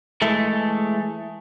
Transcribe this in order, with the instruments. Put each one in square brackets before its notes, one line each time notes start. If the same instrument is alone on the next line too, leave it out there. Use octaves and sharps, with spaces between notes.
[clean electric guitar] E3 G#3 A3 A4